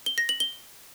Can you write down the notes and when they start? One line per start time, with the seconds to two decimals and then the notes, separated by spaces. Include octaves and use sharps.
0.06 G7
0.18 A#6
0.29 F#7
0.40 G7